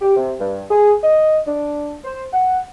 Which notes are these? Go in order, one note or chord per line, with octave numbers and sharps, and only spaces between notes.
G4
C3
G2
G#4
D#5
D4
C5
F#5